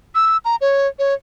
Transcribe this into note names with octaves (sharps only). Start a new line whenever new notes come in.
E6
A#5
C#5
C#5